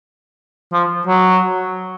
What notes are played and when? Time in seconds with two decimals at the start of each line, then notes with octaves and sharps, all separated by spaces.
0.73 F3
1.07 F#3